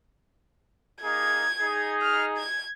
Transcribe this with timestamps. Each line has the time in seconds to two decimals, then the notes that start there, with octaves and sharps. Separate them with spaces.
1.03 A#3 D#4 G#4 G#6
1.60 D#4 G#4
2.02 F6
2.37 G#6